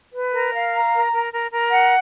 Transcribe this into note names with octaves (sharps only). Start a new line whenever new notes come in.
B4
A#4
F5
A#5
A#4
A#4
A#4
A#4
F#5